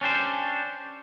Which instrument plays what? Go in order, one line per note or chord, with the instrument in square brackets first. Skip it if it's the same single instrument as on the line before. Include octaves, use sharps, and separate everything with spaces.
[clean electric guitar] C#4 D4 G4 C5